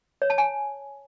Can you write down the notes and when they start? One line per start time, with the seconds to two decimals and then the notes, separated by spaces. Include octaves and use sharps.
0.22 C#5
0.30 A5
0.38 G#5